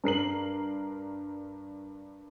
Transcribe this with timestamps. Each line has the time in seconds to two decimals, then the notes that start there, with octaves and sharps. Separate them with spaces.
0.04 G2 A#4 C7 F#7